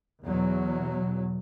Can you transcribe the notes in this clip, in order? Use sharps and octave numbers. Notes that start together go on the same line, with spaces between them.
E2 B2 F#3